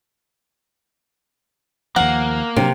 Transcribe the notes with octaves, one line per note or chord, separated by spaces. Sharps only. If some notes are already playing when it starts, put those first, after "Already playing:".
D#2 F3 A#3 F#5
C3 F#3 D4